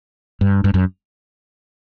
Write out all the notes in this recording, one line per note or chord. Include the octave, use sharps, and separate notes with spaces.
G2
G2
F#2